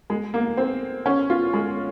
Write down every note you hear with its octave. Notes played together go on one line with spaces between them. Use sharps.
G#3
A#3
C4
C#4
F4
G#3